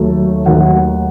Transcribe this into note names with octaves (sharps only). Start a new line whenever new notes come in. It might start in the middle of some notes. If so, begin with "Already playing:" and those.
Already playing: D#2 D#3 F#3 A3
D#2 D#3 F#3 A3 F#4 F#5